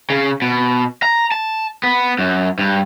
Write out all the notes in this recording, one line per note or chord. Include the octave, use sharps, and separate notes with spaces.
C#3
B2
A#5
A5
B3
F#2
G2